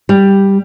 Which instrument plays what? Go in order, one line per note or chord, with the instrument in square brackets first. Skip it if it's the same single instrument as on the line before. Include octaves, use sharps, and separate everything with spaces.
[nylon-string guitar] G3